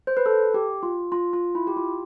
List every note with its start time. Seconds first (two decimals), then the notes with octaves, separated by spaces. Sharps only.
0.07 C5
0.17 B4
0.26 A4
0.54 G4
0.83 F4
1.12 F4
1.33 F4
1.55 E4
1.67 G4
1.77 F4